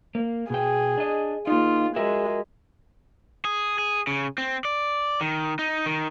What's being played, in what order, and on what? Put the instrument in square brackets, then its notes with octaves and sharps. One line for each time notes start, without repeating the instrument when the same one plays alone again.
[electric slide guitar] A#3
[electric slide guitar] B2 G5 [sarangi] G#4
[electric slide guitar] D4 D#5
[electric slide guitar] A#3 D#4 [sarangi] F4
[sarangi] G#3 [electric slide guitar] F#4 A#4 E5
[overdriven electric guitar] G#4
G#4
C#3
C4
D5
D#3
D#4
D#3